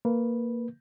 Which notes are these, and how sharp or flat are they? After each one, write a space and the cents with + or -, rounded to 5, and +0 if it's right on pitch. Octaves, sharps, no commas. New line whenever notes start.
A#3 -10 B4 -10